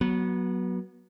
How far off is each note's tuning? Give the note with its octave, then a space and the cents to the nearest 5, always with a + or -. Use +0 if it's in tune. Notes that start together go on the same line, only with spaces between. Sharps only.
F#3 +0 B3 -25